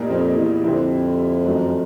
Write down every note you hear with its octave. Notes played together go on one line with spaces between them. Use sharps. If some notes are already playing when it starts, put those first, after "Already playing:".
Already playing: A#2 G3 A#3 D#4
F2
E2
F2 D3 G3 C4 E4
F#2 D#3 F#3 A3 D4